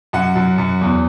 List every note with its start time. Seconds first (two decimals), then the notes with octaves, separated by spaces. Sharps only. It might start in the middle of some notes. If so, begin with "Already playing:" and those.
0.13 F#2 F#5
0.35 F#2
0.58 F#2
0.81 E2